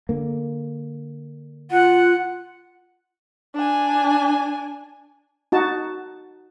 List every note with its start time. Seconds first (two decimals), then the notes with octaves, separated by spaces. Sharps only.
0.09 D3 A#3
1.71 F4 F#5
3.55 D4 G#5
5.52 D#4 F#4 A5